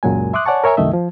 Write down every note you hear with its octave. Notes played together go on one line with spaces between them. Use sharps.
C#2 F#2 A#2 F#3 G#3 G#5
E5 C6 D6 D#6 F#6
C#5 D5 F#5 G#5 A5 C#6
A#4 C#5 E5 G#5 A#5
C2 F#2 D#3 A3 D#5 E5
F3